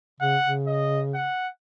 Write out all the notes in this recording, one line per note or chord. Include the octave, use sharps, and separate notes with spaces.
C#3 F#5
C#3
D#5
F#5